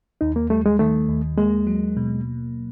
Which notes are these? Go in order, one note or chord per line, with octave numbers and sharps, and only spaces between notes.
D#2 D#4
A#3
G3 A3
G#3
D#3 A3
D#2
G#3 A#3
F#3
B2